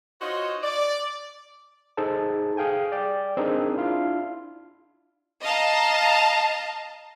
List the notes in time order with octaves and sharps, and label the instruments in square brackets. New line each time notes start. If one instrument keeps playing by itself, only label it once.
[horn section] D#4 F4 F#4 C5 C#5 D#5
D5
[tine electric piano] D#4 G#4 A4 C5 A5
G#4 F5 G5 G#5
D5 G5
C4 D4 D#4 G#4 A#4
D4 E4 F4 F5
[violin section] D#5 F5 A5 A#5